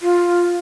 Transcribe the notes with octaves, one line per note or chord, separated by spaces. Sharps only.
F4